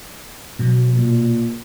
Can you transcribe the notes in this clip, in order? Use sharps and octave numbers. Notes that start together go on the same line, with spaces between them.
B2 F#3
A#2